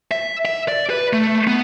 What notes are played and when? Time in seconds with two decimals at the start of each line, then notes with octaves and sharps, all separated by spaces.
0.11 E5
0.45 E5
0.68 D5
0.90 B4
1.13 A3
1.47 B3